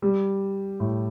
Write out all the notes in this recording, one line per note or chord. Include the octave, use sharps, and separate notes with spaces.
G3
A2